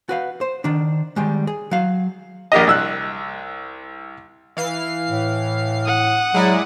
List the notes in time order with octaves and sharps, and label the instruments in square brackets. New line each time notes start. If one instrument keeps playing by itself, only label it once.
[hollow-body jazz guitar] F#4 B4 F5
C5
D#3 D4
D#3 G3 G#3
G#4
F#3 F5
[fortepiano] A#1 A#3 G4 D#5
C2 E6 F#6
[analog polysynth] E3 F5 C7
[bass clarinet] A2
[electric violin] F#5 D#6
[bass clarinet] F#3 [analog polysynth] G#3 E4 D5